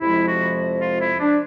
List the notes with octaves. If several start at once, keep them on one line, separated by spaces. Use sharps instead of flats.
F2 C3 F3 G#3 E4
F#4
F4
E4
D4